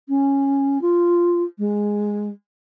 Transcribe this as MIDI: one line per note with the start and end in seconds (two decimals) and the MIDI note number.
0.08 0.81 61
0.81 1.43 65
1.58 2.29 56